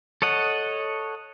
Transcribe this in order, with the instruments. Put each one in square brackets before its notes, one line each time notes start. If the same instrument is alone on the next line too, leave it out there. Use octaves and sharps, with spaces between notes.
[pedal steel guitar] A4 C#5 D#5 F#5